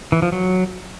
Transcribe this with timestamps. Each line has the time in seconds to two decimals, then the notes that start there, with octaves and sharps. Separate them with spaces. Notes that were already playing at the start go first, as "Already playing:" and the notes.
0.12 E3
0.22 F3
0.32 F#3